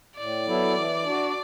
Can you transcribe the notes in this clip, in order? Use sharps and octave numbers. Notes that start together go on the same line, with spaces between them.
A2 D5
F#3 B3 E4 A4
E3
D4 F#4